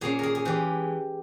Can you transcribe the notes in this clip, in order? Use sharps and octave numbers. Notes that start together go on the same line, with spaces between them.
A#2 A#3 C#4 G#4
G#4 A#4
G#4
E3 G#3 G4